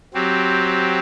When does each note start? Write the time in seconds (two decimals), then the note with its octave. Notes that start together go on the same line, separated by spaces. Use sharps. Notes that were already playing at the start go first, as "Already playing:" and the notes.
0.14 F#3 C4 G4